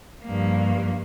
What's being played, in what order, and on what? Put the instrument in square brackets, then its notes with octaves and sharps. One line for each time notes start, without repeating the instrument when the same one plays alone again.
[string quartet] G2 F3 A#3